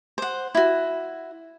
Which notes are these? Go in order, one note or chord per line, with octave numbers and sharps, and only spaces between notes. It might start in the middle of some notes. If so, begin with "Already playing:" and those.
C5 F#5
E4 F#4